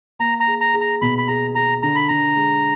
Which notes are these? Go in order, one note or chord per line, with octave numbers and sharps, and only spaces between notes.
A#3 A#5
A#5
G#4
A#5
G#4
A#5
B2 B5
B5
G#4 A#5
G#4 A#5
D3 A#5
B5
D3 A#5
G#3